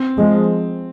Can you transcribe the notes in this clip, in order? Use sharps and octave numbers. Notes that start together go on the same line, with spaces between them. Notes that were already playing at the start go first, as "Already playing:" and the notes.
Already playing: C4
F3 G#3